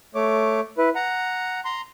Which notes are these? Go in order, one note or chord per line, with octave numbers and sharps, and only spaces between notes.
A3 C#5 D6
E4 B4
F#5 A#5
A#5 C6